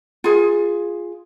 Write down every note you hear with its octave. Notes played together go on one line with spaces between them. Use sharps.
F4 G#4